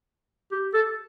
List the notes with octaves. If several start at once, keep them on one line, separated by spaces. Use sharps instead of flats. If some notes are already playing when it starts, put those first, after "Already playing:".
G4
A4